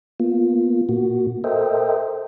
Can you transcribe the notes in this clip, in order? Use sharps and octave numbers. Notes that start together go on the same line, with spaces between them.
A#3 B3 F4
A#2 A#3 F#4
A4 A#4 C5 D#5 E5 G5